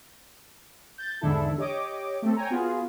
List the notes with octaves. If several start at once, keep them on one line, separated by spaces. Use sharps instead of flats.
G6 A6
E2 G#2 D3 D4 E4 A4
G4 C#5 D#5 D6
A3 C4 A4
C#5 G5 G#5 A#5
B3 F4 F#4 G#4